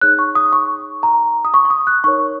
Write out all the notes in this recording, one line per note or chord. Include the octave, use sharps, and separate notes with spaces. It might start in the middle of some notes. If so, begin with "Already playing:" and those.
D#4 G#4 C#5 F#6
C#6
D#6
C#6
A#5
D#6
C#6
C#6
D#6
F#6
D#4 A#4 C#5 C#6